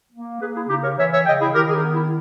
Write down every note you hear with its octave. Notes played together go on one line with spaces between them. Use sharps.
A#3
A#3 G#4 B4
E4 G#4
C#3 D#4 G4
A#4 C#5
E3 C#5 E5
C#5 E5
C#3 D#5 G5
E4 G#4
D#3 G4 A#4
G#4
D#4 G4
B3
E4